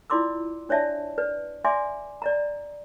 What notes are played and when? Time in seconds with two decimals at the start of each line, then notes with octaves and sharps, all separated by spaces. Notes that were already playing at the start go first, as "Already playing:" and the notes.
0.10 E4 F4 D5 C6 D6 E6
0.69 D4 C#5 D5 E5 A5
1.18 B4 D5
1.64 D5 E5 G#5 C6 D6
2.22 D5 D#5 A#5